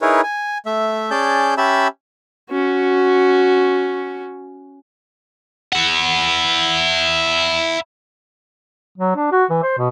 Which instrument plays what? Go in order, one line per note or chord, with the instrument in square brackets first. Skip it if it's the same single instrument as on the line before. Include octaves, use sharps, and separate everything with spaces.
[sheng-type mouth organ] D#4 E4 G#4 A#4 B4 C#5
G#5
A3 E5
C#4 G#4 D5 A5 G6
C#4 G4 E5 A5 B5 E6
[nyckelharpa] C#4 F#4
[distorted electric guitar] E4 F#5
[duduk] F#3
D4
F#4
E3
C5
B2